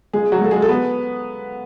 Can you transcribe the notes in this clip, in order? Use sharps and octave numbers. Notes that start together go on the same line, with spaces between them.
C#2 G#3 G#4
F#3 F#4
C#2 A4
G#3 G#4
A4
B3 B4